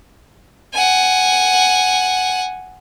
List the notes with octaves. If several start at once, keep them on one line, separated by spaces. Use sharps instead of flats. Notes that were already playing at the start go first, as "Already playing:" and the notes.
F#5 G#5